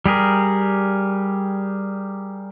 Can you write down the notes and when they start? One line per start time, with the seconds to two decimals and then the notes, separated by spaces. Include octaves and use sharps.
0.06 G3 G4 G#4 A#4